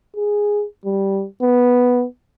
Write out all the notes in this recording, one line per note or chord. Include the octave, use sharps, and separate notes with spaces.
G#4
G3
B3